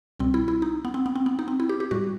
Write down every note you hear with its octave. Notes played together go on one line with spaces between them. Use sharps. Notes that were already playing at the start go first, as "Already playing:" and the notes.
C2 B2 G3 C4
E4
E4
D#4
B3
C4
B3
C4
B3
D#4
C4
E4
G4
G4
A2 G3 F#4